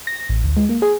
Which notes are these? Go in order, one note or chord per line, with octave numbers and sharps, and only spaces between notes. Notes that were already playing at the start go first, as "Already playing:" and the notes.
A#6
A1
D2
G#3
A#3
G#4